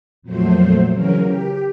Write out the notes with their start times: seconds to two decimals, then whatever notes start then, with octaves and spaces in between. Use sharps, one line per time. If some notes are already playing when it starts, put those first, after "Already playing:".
0.22 F2 A#2 F#3 A3 C5
0.90 C#3 E3 F#3 C#4 A#4
1.23 G4